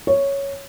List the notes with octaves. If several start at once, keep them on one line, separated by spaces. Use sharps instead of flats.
C#5